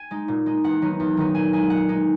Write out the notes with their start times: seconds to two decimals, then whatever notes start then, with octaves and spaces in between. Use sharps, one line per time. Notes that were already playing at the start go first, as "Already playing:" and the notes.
Already playing: G#5
0.11 G#3 D#4
0.28 A#2
0.46 G#3 D#4
0.64 E2 F#5
0.82 D#3 F#3 B3 D#4
1.00 E2
1.17 D#3 F#3 B3 D#4
1.35 A#2 G#5
1.53 G#3 D#4 G#5
1.70 A#2 F#5
1.89 G#3 D#4